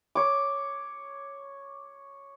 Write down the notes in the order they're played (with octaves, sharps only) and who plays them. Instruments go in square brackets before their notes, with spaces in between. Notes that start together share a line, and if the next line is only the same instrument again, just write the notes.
[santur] C#5 D6